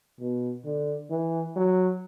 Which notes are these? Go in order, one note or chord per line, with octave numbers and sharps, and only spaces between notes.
B2
D3
E3
F#3